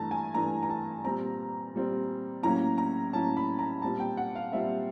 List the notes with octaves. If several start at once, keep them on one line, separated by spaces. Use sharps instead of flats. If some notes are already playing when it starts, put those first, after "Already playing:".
Already playing: G2 E3 A3 A5 A#5
G#5
G2 E3 A3 A#5
A#5
A5
A#2 G3 C4 A#5
A#2 G3 C4
A2 F#3 A#3 C#4 A#5
A#5
A2 F#3 A#3 C#4 A5
B5
A#5
A#2 G3 C4 A5
G5
F#5
F5
A#2 G3 C4 E5